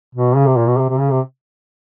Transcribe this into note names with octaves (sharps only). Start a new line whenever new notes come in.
B2
C#3
C3
A#2
B2
C3
C3
C#3
C3